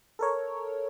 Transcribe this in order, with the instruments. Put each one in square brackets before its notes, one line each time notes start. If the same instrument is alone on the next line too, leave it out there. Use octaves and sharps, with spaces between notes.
[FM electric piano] A4 A#4 C#5